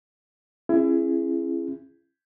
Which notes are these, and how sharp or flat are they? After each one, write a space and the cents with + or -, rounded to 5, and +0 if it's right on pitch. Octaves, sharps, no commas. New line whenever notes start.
C#4 -45 E4 +30 G#4 +0